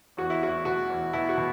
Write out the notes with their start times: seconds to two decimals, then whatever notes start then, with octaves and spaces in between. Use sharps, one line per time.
0.17 E2 F#4
0.30 E4
0.42 E2 F#4
0.65 B2 F#4
0.90 E2
1.13 B2 E4
1.29 F#4
1.37 B2